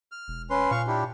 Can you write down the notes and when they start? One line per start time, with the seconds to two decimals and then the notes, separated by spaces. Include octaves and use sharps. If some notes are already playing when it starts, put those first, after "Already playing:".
0.12 F6
0.28 E1
0.50 C#4 B4 C6
0.71 A#2 F5 C#6
0.87 D4 E4 G4